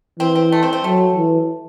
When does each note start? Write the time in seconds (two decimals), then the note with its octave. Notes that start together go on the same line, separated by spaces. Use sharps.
0.20 E3 C4
0.35 C4
0.52 A3
0.63 C4
0.73 C4
0.84 F#3 A3
1.16 E3